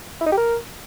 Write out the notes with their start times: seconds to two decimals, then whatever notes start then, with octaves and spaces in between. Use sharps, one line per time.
0.21 E4
0.26 D#4
0.32 G4
0.38 A#4